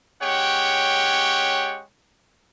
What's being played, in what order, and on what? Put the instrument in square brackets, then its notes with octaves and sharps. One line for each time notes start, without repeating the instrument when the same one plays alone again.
[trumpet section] G#3 C#4 G4 C#5 F#5 G5